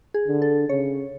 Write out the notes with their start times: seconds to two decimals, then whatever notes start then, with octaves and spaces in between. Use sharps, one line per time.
0.14 G#4
0.28 D3
0.42 A4
0.69 C#3 C#5